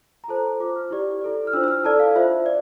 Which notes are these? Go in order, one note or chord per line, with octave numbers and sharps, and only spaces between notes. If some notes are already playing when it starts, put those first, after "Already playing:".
A#5
F4 A4 C5 A5
F4 C5 D6
F6
E4 G4 D5
E4 A4 D5
F6
D4 F4 C5 E6
E6
F6
E4 A4 D5 A5
F5
F4 C5 E5
D5